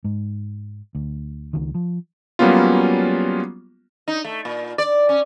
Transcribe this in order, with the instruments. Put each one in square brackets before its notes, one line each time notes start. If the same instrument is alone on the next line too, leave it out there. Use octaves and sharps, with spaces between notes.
[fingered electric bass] G#2
D2
C#2 D#3
F3
[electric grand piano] F#3 G3 A#3 B3 C#4 F4
[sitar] D#4
A3
A#2
D5
C#4